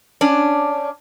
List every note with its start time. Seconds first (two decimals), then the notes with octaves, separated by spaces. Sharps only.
0.21 C#4 D4